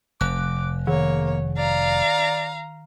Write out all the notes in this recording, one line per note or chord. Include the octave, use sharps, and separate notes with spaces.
F1 D6 F#6
D#3 A#3 C#5
D5 F5 A#5